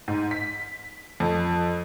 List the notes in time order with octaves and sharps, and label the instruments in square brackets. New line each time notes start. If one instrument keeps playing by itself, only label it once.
[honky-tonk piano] G#2
B6
F2